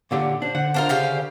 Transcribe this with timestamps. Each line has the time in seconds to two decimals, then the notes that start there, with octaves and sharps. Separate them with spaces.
0.11 A#2 D3 G4 F#5
0.42 D4 C5
0.55 D3 F#5
0.74 D4 F4 A#4 C5
0.89 C#3 G4 F5